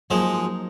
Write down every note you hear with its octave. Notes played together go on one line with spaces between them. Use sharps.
F3 F#3 G#3 A#3 D#4